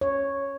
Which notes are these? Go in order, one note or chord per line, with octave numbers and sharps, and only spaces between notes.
C#5